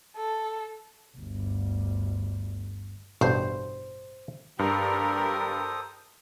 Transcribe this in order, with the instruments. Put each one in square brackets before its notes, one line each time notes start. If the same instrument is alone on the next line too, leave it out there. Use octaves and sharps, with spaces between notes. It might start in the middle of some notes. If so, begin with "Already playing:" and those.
[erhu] A4
[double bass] G1 D2
[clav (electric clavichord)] A1 G2 B2 [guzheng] C5
[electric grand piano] G2 [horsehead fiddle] G4 A#4 [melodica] A4 C5 D#6